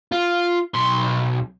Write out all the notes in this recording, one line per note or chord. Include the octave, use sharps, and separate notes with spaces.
F4
B1 C6